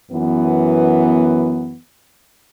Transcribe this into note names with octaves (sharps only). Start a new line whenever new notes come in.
F#2 E3 B3